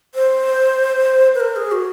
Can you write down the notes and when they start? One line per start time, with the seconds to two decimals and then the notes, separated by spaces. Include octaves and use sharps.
0.15 C5
1.35 B4
1.40 A#4
1.56 G#4
1.72 F#4